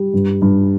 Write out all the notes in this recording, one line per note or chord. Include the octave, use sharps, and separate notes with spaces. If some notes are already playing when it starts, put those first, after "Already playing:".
Already playing: G3
G2
G2